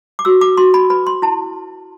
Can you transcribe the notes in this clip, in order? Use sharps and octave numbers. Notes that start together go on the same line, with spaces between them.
D6
F#4 E6
D6
F#4 C6
B5
B4 B5
C6
E4 A5